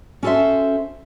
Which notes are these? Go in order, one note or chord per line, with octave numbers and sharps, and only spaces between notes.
C#4 F#4 A4 B4 C5 E5